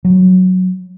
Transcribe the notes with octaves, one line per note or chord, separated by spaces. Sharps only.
F#3